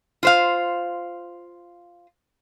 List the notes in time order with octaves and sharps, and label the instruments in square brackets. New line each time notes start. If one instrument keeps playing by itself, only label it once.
[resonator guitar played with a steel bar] F4 C5 F5